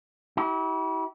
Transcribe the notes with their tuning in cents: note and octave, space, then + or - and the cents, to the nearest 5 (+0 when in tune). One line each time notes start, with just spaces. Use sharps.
E4 -35 G4 -45